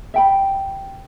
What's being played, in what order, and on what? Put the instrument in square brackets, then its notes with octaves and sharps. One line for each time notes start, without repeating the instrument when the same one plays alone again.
[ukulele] E5 G5 B5